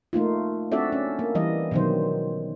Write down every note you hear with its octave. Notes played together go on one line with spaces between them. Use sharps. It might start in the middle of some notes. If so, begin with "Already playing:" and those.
A3 A#3 D#4 F4
C4 D4 F#4 A4 D5 E5
C#4
A#3
E3 G3 D#5
B2 D3 D#3 F#3 C5